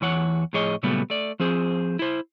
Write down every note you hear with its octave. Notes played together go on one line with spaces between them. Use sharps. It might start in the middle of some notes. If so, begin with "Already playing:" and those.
E2 E3 C#5 F#5
A2 F3 G#4 C#5 D#5
A#2 C#3 F#3 G3 A3 B3
A3 D5
F3 C4 G#4 C5
E4 C5